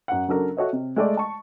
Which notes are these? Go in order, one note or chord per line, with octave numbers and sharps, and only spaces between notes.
F#2 F#5
C#3 F#3 D4 A4 A#4
F#4 A4 C#5 D#5 E5
C3
G#3 A3 D5 D#5
A5 C#6